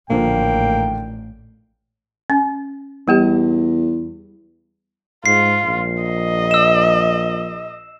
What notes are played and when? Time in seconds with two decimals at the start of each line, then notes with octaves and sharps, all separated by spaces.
0.10 A1 A#2 D3 F3 A#3 G5
2.30 C#4
3.08 E2 G3 B3 G4
5.26 G#2 F4 C7
5.64 A#1
6.03 D#5
6.51 E6 E7